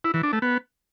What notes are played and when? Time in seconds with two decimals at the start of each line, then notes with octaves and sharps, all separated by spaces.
0.04 E4
0.14 E3
0.23 D4
0.33 A3
0.42 B3